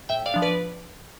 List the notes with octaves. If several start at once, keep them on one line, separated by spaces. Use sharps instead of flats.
A2 E5 G5
D5 F5
F3 B3 D4
B4 D5